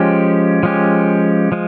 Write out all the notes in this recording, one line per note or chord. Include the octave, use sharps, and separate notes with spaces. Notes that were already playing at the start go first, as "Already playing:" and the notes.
Already playing: F3 G#3 C#4 G4
F3 G#3 C#4 G4
F3 G#3